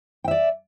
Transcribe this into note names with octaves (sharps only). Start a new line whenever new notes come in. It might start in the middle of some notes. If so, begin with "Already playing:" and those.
D5 E5 G5